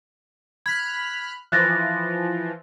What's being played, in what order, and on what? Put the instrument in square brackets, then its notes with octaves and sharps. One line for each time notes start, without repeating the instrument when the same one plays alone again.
[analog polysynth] B5 F6 F#6 [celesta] G#6 B6
[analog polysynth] E3 F3 [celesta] F#6 A6 A#6